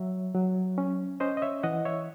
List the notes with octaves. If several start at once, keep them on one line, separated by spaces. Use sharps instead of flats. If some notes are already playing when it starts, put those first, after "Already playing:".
Already playing: F#3 C#5 E5
F#3
C#4
C#4 C5 D#5
D#5
C#5 E5
E3 D#5 F#5
C#5 E5